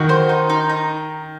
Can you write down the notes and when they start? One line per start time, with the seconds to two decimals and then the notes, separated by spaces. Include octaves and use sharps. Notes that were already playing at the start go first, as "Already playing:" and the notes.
Already playing: D#3 F#4
0.09 C5
0.29 D#4
0.50 D#4
0.69 D#4